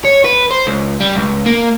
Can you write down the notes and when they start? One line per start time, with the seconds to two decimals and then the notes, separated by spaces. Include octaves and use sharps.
0.05 C#5
0.24 B4
0.51 C5
0.67 C#2
1.00 G3
1.15 C#2
1.46 A#3